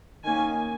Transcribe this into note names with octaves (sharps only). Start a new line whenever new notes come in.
D#3 A#3 C#4 G#5